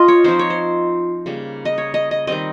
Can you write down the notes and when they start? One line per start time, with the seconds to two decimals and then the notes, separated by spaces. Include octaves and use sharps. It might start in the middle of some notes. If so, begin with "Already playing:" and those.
Already playing: F4 D#5
0.08 C#5
0.24 F3 C4 D#4 C5
0.39 C#5
0.50 C5
1.26 C#3 G3 A#3
1.65 D#5
1.78 C#5
1.94 D#5
2.11 D#5
2.27 D#3 G3 C4 D#5